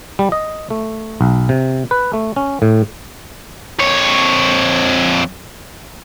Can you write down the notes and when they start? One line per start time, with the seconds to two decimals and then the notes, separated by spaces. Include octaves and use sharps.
0.19 G3
0.32 D#5
0.70 A3
1.21 B1
1.49 C3
1.91 B4
2.13 A3
2.36 C#4
2.62 A2
3.79 F2 C#5